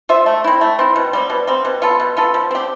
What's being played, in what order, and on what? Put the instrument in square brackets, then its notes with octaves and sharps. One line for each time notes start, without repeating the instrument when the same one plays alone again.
[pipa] F4 C5 E5
A3
C4 E4
A3
C4 E4
B2
G3 C4
B2
G3 C4
B2
B3 F4 A4
B2
B3 F4 A4
F3
C4 G4